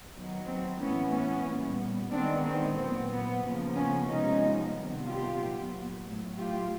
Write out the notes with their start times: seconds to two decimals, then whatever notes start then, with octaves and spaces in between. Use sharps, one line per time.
0.14 D#3 F#3 B3
0.46 C4
0.79 A2 E3 A3 B3 C#4
1.12 B3 C#4
1.46 A#2 G3 B3
2.11 D#3 G#3 B3 C4 D4
2.44 C4
2.77 A#2 F#3 B3 C4
3.10 B3
3.43 C#3 F3 A#3
3.75 B3 C#4
4.08 C3 F3 G#3 B3 C#4 D#4
4.74 C3 D#3 G3 B3
5.06 F4 G4
5.39 A#2 F#3 B3
6.05 A2 F#3 A3
6.38 F4 G4